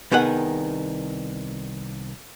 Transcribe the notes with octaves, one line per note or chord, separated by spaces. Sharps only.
C2 D#3 B3 G#4 F#5